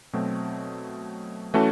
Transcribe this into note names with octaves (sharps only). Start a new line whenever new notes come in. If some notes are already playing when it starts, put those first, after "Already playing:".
B2 F#3 A3 C4
E3 A3 C#4 F#4 A4